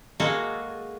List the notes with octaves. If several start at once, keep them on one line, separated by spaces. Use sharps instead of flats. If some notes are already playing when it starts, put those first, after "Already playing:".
G#3 A#3 F#4 G#4 A4